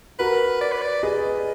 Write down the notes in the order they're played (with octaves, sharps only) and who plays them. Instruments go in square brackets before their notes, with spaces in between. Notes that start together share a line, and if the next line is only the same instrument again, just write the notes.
[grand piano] F#4 A#4 [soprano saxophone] B4
[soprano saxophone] D5
B4
D5
[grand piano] G#4 B4 [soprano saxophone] D#5